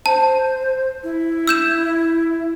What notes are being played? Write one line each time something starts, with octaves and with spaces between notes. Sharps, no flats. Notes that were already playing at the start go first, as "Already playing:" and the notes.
C5 A5
E4
E6 G6 E7